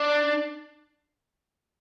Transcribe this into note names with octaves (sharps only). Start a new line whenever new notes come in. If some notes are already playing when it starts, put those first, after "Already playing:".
Already playing: D4